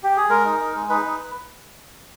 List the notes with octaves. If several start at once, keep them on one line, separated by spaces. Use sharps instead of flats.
G4
G#4
G#3 A#4
D#4
D#4
G#3
D#4 B4
D#4